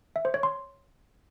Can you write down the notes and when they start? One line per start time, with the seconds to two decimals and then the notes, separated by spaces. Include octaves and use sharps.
0.16 E5
0.25 C5
0.34 C#5
0.43 C6